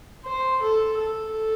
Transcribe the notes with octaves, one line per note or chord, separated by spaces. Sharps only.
C5
A4
A4